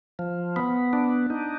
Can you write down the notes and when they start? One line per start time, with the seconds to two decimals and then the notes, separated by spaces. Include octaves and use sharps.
0.19 F3
0.56 B3
0.93 D4
1.30 D#4